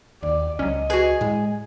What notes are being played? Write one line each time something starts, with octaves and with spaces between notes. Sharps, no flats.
D#2 D5
C#2 F#3 C#4 D#5
F#4 G#4 B4
A2 G#3